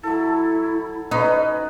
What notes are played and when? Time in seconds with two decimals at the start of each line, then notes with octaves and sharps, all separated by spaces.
0.03 F#3 E4 A4
1.11 C#4 D#4 B4 D#5